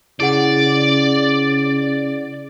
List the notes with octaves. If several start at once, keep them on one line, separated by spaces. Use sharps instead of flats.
C#3 E4 G#4 D5 F#5